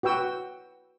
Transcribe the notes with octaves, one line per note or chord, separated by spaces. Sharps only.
F#4 B4 G5 E6